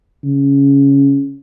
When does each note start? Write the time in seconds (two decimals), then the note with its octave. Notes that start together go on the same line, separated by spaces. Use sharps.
0.24 C#3